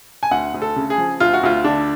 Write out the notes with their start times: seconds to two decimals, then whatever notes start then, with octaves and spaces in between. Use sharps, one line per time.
0.23 G#5
0.31 D2 F#5
0.54 D2
0.62 A4
0.76 C#3
0.90 G#4
0.98 F3
1.20 D2 F4
1.34 F#4
1.43 D2 F4
1.64 D3 D4